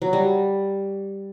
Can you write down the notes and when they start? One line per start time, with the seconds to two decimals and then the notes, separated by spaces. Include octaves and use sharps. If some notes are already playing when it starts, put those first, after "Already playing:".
0.02 F#3
0.13 G3